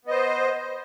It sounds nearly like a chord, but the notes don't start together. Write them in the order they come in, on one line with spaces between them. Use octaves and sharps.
B3 D#5 C5